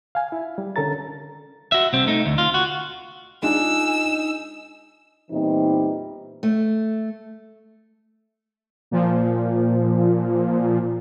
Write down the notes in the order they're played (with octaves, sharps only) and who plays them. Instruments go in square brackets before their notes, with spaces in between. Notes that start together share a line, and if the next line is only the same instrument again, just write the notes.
[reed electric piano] F5 G#5
E4
G3
D3 C#4 A4 A#4 A#5 A6
[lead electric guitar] F#4 E5
C2 C4
A3 D#4
D2
F4
F#4
[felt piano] G#3 D4 F4 [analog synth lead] D#4 [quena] G#5 [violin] E6
[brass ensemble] E2 A#2 E3 G3 C4 D#4
[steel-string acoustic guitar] A3
[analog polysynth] A#2 F3